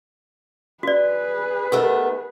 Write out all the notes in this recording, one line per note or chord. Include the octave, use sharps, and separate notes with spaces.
F#4 G#4 B4 D5
D#3 A3 B3 G4 A#4